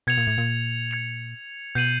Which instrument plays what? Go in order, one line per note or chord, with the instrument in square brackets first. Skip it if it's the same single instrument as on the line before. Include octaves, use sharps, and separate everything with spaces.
[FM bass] B2 [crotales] G#6 C#7 F7
[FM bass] A#2
A2
A#2
[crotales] G#6 C#7 F7
[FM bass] B2 [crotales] G6 C7 D#7 F#7